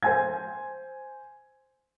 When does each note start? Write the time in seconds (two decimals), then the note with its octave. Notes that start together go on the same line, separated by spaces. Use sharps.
0.03 C5 G#5 G#6